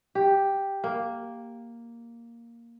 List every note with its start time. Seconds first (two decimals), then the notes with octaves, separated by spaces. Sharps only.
0.15 G4
0.84 A#3